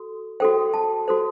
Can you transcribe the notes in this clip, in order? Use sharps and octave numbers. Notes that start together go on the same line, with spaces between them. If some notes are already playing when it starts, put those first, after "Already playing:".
Already playing: F#4 A4
F#4 A4 C5 G5
A5
F#4 A4 C5